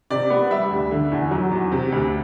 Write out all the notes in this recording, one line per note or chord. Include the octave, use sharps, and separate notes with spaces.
C3 D5
B3
G3 E5
D2
D3
E2
F#3
E2
C3
D2